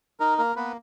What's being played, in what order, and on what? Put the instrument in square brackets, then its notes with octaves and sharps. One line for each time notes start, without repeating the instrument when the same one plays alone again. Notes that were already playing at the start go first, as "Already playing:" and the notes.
[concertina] D#4 A#4
A#3 A#4
A#3 B3 B4